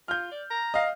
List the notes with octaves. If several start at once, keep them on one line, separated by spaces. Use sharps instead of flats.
F4 F6 G6
D5
A#5
D#5 F5